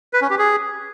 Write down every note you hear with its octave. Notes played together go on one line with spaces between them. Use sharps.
B4
C#4
G4
G#4